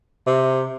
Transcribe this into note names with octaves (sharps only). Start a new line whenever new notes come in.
C3